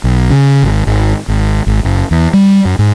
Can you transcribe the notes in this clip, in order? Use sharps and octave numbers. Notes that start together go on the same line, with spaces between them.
B1
C#3
G#1
G#1
G#1
G#1
F#1
E2
G3
F#2
G#2